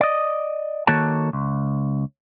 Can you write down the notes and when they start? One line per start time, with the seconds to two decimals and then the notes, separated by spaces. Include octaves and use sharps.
0.01 D5 D#5
0.87 D#3 A#3 F#4 A4 C#5 A5
1.33 C#2